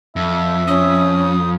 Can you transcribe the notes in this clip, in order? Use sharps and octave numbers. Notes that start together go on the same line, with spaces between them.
F2 E5
C#4 D#6